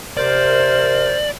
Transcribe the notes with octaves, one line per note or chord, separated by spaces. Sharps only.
C3 A#4 C5 D5